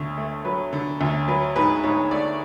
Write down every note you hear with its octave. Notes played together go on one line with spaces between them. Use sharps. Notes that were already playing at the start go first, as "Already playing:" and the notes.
Already playing: D2 D3 C#5
A3
F#3 B4
D3
D2
F#3 B4
G#2 B4
G#2 C#5
A3 D5